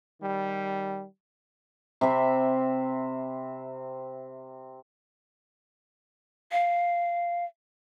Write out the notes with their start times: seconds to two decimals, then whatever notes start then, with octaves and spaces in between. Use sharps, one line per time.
0.20 D#3 G3
2.01 C3 C4 E5 B5
6.52 F5